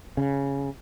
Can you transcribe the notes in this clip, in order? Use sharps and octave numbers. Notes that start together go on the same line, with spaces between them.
C#3